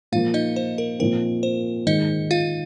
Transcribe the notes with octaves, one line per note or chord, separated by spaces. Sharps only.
A#2 F3 A#3 F4 F5
D#4 D#5
C5
A#4
A#2 F3 C4 A#4
C5
G#2 D#3 G#3 D#4 D#5
F4 F5